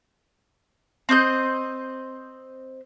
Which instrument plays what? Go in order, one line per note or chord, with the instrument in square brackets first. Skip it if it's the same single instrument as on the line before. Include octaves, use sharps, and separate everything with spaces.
[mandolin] C4 C5 D#5 G6